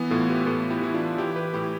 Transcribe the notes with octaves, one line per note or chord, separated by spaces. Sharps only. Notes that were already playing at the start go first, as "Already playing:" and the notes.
Already playing: E3 B3
A2 F4 A4
G4 B4
A2 F4 A4
E4 G4
E3 E4
D4 F4
E3 E4 G4
G4 B4
A2 E4 G4